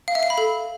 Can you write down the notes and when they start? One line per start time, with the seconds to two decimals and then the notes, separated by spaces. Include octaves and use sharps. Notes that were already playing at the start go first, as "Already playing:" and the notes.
0.08 F5
0.15 E5
0.23 F5
0.30 B5
0.38 A4